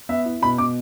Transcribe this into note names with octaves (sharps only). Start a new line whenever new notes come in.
B3 E5
E4
B2 B5
B2 D6